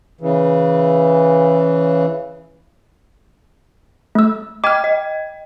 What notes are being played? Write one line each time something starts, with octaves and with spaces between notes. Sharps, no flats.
C#3 E3
A3 E6
D#5 G5 D6 F6 G#6
D#5